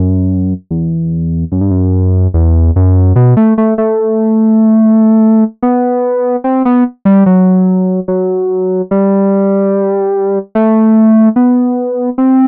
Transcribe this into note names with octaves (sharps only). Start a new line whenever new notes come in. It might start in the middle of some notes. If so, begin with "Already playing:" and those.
Already playing: F#2
E2
F#2
G2
F#2
E2
F#2
B2
A3
A3
A3
B3
C4
B3
G3
F#3
F#3
G3
A3
B3
C4